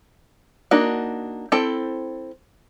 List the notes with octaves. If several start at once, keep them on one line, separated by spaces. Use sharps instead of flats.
A#3 D4 D#4 F#4
C4 E4 A4 G5